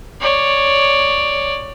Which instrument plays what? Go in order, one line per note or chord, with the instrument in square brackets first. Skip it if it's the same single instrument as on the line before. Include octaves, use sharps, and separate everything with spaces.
[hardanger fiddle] C#5 D5